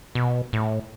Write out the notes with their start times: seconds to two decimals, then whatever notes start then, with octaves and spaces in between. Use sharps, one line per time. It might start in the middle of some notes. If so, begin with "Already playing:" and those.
0.15 B2
0.53 A2